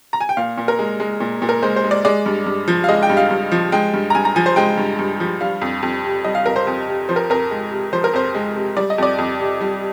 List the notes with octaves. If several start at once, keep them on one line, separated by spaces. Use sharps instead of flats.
A#5
G#5
G5
A#2 F5
A#2
A#4
G#3
G#3
A#2
A#2
A#4
G#3 C5
C5
G#3
D5
G#3 D5
G2
G2
F3
F5
G#3 D#5
G5
G2
F5
G2
F3
G#3 G5
G2
A#5
G2 G#5
A#5
F3 G#5
C5
G#3 G5
G2
G2
F3
G3 F5
F2
F2
C3
G3 D#5
F5
F2 A#4
C5
F2
C3
F3 C5
A#4
F2 A#4
G#3
C3
F3 C5
A#4
F2 C5
G#3
C3
G3 D5
D#5
F2 D5
F2
C3
G3